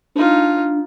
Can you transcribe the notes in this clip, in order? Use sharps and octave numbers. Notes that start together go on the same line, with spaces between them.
D4 D#4 F4